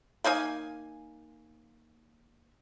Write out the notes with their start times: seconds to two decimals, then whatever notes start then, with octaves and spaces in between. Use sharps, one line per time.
0.24 A#3 D#4 F5 G#5